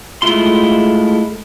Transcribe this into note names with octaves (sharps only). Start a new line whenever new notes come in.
G#3 A3 E4 F4 C6